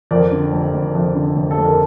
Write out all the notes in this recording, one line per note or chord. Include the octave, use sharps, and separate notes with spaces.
F2 A#4 D5
D3
F1
F1
F2
D3
F1
A4
F1
A#4